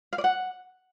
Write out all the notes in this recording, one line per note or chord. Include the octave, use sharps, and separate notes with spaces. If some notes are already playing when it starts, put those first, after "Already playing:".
F5
D5
F#5